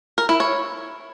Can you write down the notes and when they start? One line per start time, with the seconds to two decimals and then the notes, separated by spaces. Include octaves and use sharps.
0.18 A#4
0.29 E4
0.40 C#5